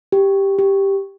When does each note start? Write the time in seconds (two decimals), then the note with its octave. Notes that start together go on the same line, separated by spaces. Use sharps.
0.12 G4
0.59 G4